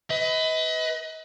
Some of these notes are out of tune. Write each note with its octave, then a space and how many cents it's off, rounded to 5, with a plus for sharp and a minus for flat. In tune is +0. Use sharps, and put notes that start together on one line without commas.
B4 +25 D#5 +40